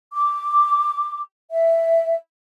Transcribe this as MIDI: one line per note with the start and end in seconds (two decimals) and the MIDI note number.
0.12 1.19 86
1.51 2.14 76